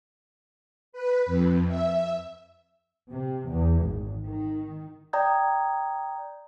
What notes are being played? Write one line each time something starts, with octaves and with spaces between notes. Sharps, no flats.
B4
F2
E5
C3
E2
G#1
D#3
D5 G5 A#5 D#6 G6 G#6